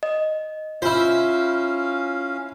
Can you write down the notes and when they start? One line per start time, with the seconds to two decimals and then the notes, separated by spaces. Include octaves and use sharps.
0.03 D#5
0.82 C#4 E4 F4 C5 F5